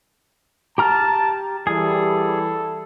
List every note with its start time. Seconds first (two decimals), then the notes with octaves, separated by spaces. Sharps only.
0.78 G4 A5 A#5 F6
1.67 E3 G3 G#4 A4